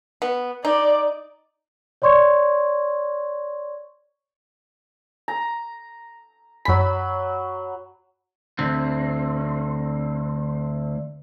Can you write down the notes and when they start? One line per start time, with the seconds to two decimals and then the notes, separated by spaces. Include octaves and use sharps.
0.22 B3
0.65 D#4 D5
2.02 C#5 D5 C6 C#6 G#6
5.28 A#5
6.65 F#2 F#3 B5 B6
8.59 D2 C4